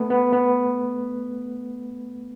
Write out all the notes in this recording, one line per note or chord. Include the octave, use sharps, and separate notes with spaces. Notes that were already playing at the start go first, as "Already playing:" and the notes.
Already playing: A3 B3
B3
B3